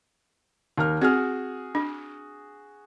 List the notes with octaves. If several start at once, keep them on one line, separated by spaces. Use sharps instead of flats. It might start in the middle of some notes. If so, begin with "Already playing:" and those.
D#2 A#4 F6
C4 F#4 G#4 F6
D4